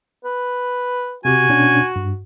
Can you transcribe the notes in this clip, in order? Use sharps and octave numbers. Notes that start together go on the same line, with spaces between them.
B4
C3 F#4 G4 G#5
B2 C#4 D4
G2